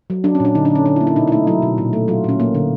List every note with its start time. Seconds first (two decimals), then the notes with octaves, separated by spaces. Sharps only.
0.10 F#3
0.24 F#3 D4
0.35 C#4
0.40 A#2 D4
0.55 D3 D#4
0.65 D4
0.70 D3
0.75 C#4
0.86 D3 D4
0.96 E4
1.01 A#3
1.07 E4
1.16 B2 D#4
1.28 E4
1.32 A3 D#4
1.47 F#3 E4
1.62 B2
1.78 A#2
1.93 A3
2.08 F#3 F4
2.24 A#2 C#4
2.40 A#3
2.55 D3